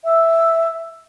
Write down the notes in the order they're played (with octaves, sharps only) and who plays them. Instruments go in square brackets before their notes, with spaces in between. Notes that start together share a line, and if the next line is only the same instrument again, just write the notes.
[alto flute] E5